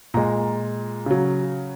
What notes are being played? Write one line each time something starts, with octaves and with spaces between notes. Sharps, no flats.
A#2 G#3 A#5
C#3 F#3